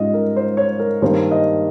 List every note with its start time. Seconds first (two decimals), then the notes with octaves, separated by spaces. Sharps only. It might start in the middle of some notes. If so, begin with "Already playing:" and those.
Already playing: G#2 G3 C#4 F4 D#5
0.14 A#4
0.36 C5
0.57 C#5
0.79 A#4
1.02 G2 D#3 A#3 C5
1.31 D#5